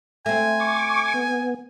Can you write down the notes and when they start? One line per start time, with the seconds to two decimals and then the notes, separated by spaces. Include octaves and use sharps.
0.26 A3 C4 G#5
0.60 C#6 D6
1.14 B3